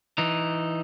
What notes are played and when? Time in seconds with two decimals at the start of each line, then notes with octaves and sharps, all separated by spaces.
0.18 E3 D#4